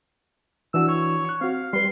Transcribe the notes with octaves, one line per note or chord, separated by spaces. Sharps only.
E3 D4 F#4 E6
C#5
C#6 F#6
C4 F#4 F5
G3 B4 C6